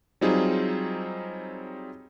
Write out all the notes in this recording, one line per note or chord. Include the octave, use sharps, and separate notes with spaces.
F#3 G3 C4 D#4 F4 G#4